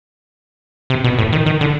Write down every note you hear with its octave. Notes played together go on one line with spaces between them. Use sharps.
C3
B2
A2
D#3
D#3
D3